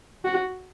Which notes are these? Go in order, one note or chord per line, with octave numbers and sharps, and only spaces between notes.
F#4